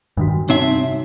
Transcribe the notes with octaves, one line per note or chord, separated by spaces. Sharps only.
G2 D#3 D4 F#4
C2 C4 D4 D#4 C#5 E5